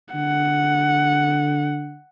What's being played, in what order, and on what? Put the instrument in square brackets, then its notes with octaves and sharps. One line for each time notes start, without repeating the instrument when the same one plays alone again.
[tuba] D3 [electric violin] F#5